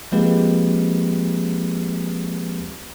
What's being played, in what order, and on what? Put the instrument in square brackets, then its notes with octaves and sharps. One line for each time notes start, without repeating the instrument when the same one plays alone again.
[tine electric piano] F3 G#3 A#3 C4 G4 B4